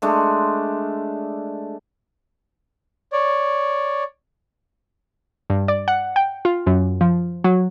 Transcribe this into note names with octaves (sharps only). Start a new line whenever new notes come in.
G#3 A3 D4
C#5 D5
G2
D5
F#5
G5
F4
F#2
F3
F#3